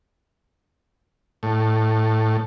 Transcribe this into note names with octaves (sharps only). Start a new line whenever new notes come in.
A2